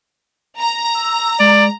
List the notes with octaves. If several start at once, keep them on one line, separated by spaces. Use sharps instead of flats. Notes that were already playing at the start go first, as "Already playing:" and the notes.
A#5
E6
G#3 D5